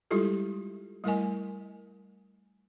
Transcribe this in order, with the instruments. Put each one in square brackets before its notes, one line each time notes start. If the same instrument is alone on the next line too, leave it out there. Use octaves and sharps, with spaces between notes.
[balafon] G3 G#3 E4 F4 G4 A4
G3 A3 E4 A#4 D#5 G#5